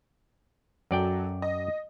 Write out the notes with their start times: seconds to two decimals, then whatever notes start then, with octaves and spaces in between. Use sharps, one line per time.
0.91 F#2 F#3 A4 D5 G5
1.42 D#5